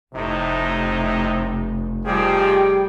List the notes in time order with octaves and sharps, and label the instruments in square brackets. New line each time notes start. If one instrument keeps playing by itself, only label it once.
[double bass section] F1 [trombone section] A2 C3 D#4
[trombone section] D#3 F3 G#4 [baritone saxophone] G3 [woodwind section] G4 G5